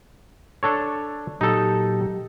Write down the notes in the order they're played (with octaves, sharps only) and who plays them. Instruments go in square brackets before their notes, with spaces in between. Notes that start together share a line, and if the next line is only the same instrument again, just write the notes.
[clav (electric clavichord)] D4 A4 C#5
[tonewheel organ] A#2 F#3 G4 [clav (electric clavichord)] D#4 A4